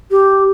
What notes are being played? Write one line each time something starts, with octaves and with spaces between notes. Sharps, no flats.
G4